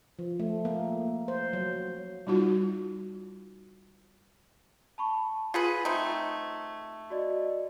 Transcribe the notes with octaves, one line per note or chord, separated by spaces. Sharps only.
F3
A3
A#3
C5
F#3
G3 D#4 F4 F#4
A5 B5 C#6
F4 G#4 B4 G#6 B6 C#7
A3 C4 D#4
F#4 D5 D#5